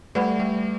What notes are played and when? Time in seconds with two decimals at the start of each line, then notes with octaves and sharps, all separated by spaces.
0.15 G3 A3 B4 D5 F#5 B5
0.39 G3 A3